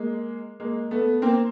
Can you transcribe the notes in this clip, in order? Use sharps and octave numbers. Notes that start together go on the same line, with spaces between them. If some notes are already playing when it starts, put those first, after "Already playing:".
Already playing: G#3 A#3
G#3 A#3
A3 B3
A#3 C4